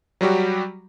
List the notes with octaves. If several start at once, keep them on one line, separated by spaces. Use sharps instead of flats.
F#3 G3 F#4 G4